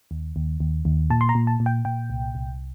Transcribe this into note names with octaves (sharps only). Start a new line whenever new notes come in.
D#2
D#2
D#2
D#2
A#2 A5
C6
A#5
A#2
A5
A#2
G5
A#2 G5
C2
C2